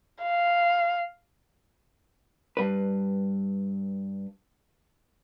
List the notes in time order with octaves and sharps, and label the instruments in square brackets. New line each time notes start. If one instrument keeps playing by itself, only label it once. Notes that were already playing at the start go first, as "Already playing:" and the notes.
[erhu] F5
[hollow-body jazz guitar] G2 B4